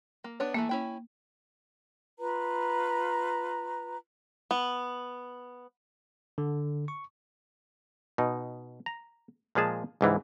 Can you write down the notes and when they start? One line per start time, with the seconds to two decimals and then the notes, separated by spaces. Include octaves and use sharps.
0.24 A#3
0.40 B3 D4 C#5
0.54 E3 A3 A#3 A5
0.69 C#4 E4 G5
2.18 F4 B4 A#5
4.51 B3
6.38 D3
6.88 C#6
8.18 B2 D#4
8.86 A#5
9.55 A#2 F3 G#3 G#4 A5
10.01 C#2 G#2 E3 G3